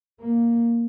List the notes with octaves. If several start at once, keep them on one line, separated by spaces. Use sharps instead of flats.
A#3